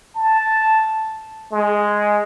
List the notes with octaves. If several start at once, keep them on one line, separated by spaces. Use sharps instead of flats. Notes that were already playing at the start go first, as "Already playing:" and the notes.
A5
G#3